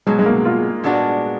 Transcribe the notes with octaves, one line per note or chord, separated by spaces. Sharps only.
B2 F#3 G#3 B3
G#3
A#3
F4
A#2 G#3 B3 D4 F#4